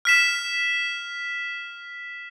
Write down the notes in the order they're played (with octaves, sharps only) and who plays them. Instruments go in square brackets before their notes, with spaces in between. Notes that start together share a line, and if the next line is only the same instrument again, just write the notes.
[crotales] F6 B6 E7